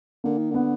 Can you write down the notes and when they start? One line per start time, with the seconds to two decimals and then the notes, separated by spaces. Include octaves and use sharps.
0.24 D3 A#3
0.38 D#3
0.51 D3 B3